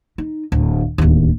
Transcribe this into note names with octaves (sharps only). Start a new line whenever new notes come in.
D#4
D1
D1 D#2